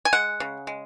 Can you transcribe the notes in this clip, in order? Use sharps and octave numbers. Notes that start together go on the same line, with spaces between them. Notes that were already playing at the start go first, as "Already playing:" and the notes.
G#5
G#3 F#5
C#3
G#3